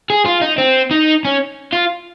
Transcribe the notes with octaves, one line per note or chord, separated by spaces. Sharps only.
G#4
F4
D#4
C4
D#4
C#4
F4